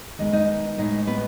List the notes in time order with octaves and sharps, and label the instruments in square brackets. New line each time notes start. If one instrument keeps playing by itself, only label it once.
[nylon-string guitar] D#3 G#3 B3 D#5
D#4 D#5
A2 G#3 B3 D#4 D#5
B3 B4